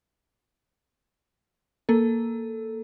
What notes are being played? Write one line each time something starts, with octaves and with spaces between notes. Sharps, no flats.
A#3 A4